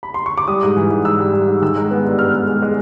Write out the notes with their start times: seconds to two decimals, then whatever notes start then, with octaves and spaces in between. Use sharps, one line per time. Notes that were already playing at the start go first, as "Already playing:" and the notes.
0.03 B5
0.14 C6
0.26 C#6
0.38 D6
0.48 G3 D#6
0.63 G#2
0.77 E3
0.91 G#2
1.05 G#2 E6
1.20 G3
1.33 G3
1.48 G#2
1.62 D#3 E6
1.76 G#3
1.91 B3
2.05 G2
2.19 B3 F6
2.34 G#3
2.47 G#3
2.62 G#3